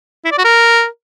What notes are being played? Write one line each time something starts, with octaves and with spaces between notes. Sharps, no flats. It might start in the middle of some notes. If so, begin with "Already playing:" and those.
E4
D5
F#4
A#4